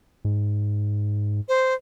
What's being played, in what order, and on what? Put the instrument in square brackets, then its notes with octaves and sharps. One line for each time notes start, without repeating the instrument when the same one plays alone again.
[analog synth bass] G#2
[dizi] C5